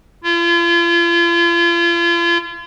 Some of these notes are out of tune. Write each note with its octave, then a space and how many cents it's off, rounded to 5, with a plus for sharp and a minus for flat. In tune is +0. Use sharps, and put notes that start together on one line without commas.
F4 -40